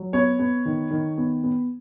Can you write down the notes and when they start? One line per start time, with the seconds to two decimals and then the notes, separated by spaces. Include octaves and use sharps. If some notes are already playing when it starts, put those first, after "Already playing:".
Already playing: F#3
0.13 B3 C#5
0.39 B3
0.65 D#3
0.91 D#3
1.17 B3
1.43 B3